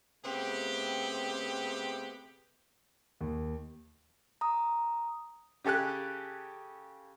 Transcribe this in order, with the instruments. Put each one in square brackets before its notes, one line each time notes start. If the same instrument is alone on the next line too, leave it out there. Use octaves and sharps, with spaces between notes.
[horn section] C#3 A3 B3 C4 G4
[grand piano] D#2
[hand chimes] A#5 D#6
[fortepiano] C#3 G4 A4 G#5 F#6